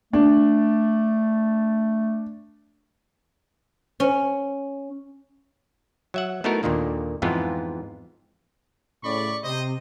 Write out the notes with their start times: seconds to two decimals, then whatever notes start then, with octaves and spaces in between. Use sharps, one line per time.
0.13 A3 D4
4.00 C#4
6.14 F#3 E5 F#5
6.44 A3 B3 D#4 E4 F#4 A#4
6.63 D#2 A#2 D3 D#3 A#3
7.22 F2 G#2 E3 G#3 B3 F4
9.04 A2 C#3 D5 B5 C#6
9.43 C3 C5 D#5